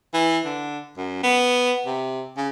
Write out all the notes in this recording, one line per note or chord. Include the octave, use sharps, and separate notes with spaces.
E3
D3
F#2
B3
C3
C#3